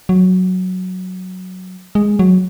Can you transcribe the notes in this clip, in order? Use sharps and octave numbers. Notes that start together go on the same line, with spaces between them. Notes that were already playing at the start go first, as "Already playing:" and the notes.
F#3
G#3
F#3